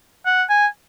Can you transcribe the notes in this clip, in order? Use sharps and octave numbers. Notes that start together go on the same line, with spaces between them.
F#5
G#5